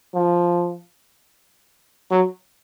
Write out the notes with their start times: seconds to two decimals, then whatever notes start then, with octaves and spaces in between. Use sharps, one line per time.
0.15 F3
2.11 F#3